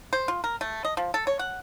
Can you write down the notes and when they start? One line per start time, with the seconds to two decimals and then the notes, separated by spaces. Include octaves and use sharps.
0.13 C5
0.28 F4
0.44 A#4
0.61 A3
0.85 D#5
0.97 F3
1.14 A4
1.27 C#5
1.39 F#5